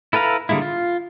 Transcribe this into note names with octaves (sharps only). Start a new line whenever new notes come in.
E4 A4 B4 F5 A#5
D3 G3 G#3 A#3 E4
F4